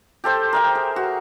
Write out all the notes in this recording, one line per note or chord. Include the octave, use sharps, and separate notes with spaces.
G4 A4 C5 G5
A#4 E5 G5
G#4
F#4